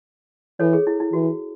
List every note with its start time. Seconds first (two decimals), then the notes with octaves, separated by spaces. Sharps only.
0.60 E3 A4 C#5
0.73 G#4
0.87 E4
1.00 E4
1.13 E3 F#4